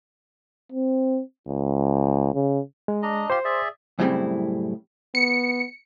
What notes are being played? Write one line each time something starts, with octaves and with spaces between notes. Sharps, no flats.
C4
C#2
C#3
G#3
D4 D#5 A#5
F4 G4 C5 C6
G#4 D5 E5
F#2 A2 C#3 G3 C4 E4
B3 C#7